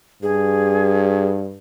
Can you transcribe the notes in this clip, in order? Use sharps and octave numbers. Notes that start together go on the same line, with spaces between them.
G2 G#4